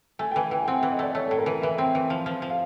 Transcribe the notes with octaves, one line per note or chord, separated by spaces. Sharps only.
A3 G#5
G5
E3 G#5
E3 G5
G5
C4 F#5
E5
E3
D#5
A3 D5
A3 C#5
A2 A4
A#4
E3
E3 E5
C4
E3
F3
F3
F3
F5